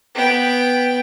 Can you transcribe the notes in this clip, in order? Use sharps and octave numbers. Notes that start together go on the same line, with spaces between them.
B3 G5